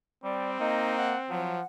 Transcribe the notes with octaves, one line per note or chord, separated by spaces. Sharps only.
G3 C4 D5
A#3 D#4 D#5
F#5
F3 F#3 F#5